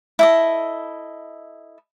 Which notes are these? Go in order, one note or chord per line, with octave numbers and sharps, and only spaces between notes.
E4 A4 D#5